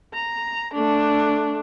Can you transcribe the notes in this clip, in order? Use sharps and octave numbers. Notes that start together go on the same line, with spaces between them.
A#5
A3 D4